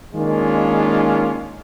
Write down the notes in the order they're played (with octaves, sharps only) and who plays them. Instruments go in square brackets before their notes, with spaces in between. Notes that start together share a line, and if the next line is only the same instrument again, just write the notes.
[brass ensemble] D#3 G#3 A#3 C#4 D4 F4